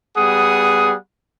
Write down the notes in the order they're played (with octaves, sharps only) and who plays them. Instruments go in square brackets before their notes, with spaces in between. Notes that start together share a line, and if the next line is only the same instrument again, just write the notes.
[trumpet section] G3 B3 G#4 F#5 D#6